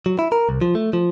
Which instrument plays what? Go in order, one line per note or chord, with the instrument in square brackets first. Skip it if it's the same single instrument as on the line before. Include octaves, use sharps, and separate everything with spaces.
[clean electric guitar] F#3
E4
A#4
C2
F3
A3
F3